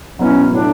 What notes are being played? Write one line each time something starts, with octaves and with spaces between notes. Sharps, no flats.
B2 F#3 B3 C#4 E4 B4
A2 F#3 A3 D4